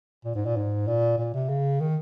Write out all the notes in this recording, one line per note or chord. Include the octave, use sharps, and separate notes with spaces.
A#2
G#2
A#2
G#2
A#2
A#2
C3
C#3
D#3